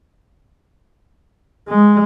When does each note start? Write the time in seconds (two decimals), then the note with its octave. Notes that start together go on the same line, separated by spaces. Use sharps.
1.69 G#3